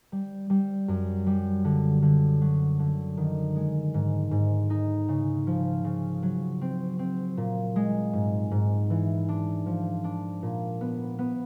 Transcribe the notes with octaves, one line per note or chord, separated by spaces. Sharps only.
G3
G3
F#2
G3
D3
D3
F#3
D3
D#3
G#3
G#2
G#2
D#4
C#3
F3
C#3
F#3
C4
C4
A#2
G#3
G#2
G#2
E3
D4
F3
D4
A#2
B3
B3